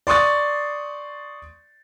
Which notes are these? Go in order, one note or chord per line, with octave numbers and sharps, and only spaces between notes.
D5 C6 C#6 D#6 A6